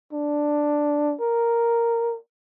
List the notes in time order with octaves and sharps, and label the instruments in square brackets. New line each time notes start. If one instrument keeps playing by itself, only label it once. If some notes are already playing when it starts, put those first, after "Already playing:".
[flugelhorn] D4
A#4